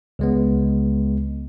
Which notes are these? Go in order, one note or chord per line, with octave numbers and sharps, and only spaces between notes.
C#2 G#3 B3